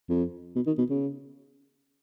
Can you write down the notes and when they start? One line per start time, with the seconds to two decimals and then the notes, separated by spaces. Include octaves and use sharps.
0.09 F2
0.55 B2
0.67 D#3
0.78 B2
0.90 C#3